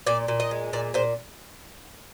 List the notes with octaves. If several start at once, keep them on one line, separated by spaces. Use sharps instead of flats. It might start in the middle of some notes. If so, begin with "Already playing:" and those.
A#2 D5
A#2
D#5
G#3
A#2 D5
A#2 C5